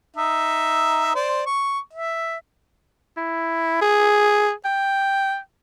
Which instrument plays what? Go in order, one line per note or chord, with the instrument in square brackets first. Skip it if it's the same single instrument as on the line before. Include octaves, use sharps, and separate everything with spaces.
[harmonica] D#4 E5
C5 D5
C#6
E5
[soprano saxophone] E4
G#4
G5